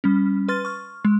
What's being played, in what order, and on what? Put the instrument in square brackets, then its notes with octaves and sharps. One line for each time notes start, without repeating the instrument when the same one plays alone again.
[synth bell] G3 C#4
B4 C6 F6 A6
C#6 F6
G#3